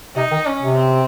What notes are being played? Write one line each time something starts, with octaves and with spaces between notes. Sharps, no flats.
C3 D#4
D#3
C#4
C3
C4